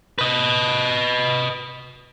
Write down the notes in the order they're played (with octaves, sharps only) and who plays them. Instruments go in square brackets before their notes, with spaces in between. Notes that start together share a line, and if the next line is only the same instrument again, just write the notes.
[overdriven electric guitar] B4 D#5